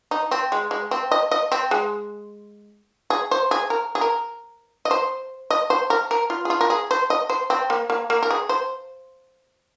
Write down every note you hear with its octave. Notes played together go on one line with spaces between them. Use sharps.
D#4
C4
G#3
G#3
C4
D#5
D#5
C4
G#3
G#4
C5
G#4
A#4
G#4
A#4
D#5
C5
D#5
C5
A#4
A#4
F4
G#4
F4
A#4
G#4
C5
D#5
C5
C4
A#3
A#3
A#3
A#4
G#4
C5